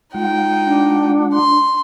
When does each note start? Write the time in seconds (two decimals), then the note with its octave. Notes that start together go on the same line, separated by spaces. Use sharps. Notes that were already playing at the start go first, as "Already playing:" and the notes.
0.14 G#3 D#4 F4 F#5 G5
0.67 D4
1.34 C6